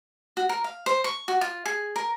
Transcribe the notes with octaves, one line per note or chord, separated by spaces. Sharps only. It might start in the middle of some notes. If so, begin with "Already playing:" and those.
F#4
A#4
F5
C5
C#6
F#4
F4
G#4
A#4